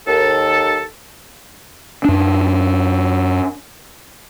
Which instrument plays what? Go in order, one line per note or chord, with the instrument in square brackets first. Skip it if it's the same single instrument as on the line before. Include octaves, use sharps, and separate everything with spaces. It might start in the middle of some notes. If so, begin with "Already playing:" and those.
[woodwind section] D#2 A4
[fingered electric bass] F#2 D4